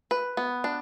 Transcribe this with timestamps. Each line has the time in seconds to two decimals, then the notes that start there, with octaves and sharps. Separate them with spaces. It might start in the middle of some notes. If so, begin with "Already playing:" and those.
0.11 B4
0.37 B3
0.64 D4